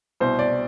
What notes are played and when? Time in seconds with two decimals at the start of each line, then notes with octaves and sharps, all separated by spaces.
0.20 C2 B2 C5
0.39 D5